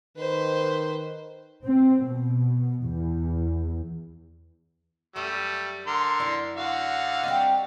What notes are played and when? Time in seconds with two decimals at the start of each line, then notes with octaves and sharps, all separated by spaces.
0.17 D#3 B4 C5
1.65 C4
2.02 B2
2.85 E2
5.16 F#2 G3 A3
5.87 D3 A#4 C6
6.20 F#2 E4 D5
6.57 D3 F#4 F5
7.24 G3 C4 D#5